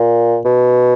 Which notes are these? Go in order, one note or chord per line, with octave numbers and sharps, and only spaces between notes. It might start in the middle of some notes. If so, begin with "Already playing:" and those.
Already playing: A#2
B2